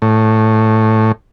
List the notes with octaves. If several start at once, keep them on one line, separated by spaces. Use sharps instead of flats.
A2